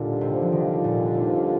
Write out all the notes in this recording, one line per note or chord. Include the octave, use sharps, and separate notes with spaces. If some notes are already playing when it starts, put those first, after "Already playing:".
Already playing: D#2 A#2 D3 G3 D4 F4
C3
F3
D#3
A#2
C3